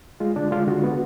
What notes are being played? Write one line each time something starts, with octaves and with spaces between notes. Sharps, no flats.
G#3 F4
D3 D4
G#3 F4
D3 F#4
B3